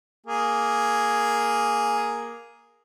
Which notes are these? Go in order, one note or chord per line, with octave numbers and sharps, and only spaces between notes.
A#3 G#4